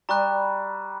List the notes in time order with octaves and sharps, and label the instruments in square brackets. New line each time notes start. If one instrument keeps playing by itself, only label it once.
[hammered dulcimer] G3 [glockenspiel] A#5 C#6 F#6